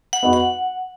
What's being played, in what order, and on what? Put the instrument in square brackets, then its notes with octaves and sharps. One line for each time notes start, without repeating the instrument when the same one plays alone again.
[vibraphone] F#5
[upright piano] B3 D#4 F#4
[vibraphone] F#5